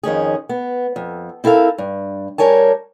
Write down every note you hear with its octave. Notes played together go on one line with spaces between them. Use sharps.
F2 D#3 C#4 G#4
B3
F2
C4 E4 A4 A#4 F5
G2
G3 A#4 C#5 G#5 A5